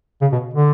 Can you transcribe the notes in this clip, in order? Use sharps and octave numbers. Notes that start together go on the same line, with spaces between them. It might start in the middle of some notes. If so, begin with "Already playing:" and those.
C#3
B2
D3